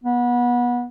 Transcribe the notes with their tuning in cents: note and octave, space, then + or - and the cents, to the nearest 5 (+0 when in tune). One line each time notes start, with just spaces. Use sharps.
B3 -25